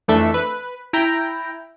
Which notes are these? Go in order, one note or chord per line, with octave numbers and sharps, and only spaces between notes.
F2 E3 A3 D4 A4 E5
B4
E4 G5 A#5